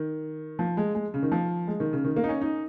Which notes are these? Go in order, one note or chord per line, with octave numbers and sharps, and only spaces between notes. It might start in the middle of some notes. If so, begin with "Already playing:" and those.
Already playing: D#3
F3
G#3
G#3
C#3
D#3
F3
G#3
D#3
C#3
D#3
A#3
D#4
C#4
D#4